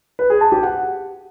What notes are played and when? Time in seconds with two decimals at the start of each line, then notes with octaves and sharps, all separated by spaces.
0.19 B4
0.30 G#4
0.41 A5
0.52 G4
0.63 F#5